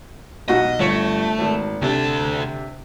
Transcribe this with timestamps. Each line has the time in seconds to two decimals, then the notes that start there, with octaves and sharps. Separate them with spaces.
0.48 B1 F#4 D#5 A#6
0.79 G1 A3 C#5 C#7
1.39 G#1
1.82 D2 C3 D4 A4